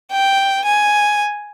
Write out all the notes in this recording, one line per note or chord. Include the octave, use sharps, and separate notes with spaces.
G5
G#5